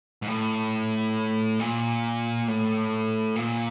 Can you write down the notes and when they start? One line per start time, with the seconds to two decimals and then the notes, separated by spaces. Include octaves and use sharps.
0.22 G#2
0.27 A2
1.59 A#2
2.47 A2
3.36 A#2